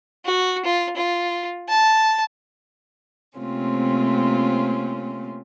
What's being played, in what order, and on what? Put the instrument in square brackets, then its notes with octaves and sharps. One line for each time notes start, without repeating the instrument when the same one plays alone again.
[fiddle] F#4
F4
F4
A5
[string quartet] C3 A3 A#3 C4 C#4 F4